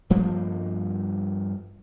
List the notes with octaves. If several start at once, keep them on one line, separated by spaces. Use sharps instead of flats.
G2 F3 G3 A#3